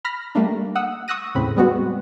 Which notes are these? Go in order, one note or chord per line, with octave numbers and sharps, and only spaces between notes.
B5 F6 A#6 B6
G3 A3 A#3 D4
F#5 D#6 E6
C#6 D#6 E6 F#6 A#6 D#7
E2 A2 C#3 C4 B5
G3 G#3 B3 C4 F#4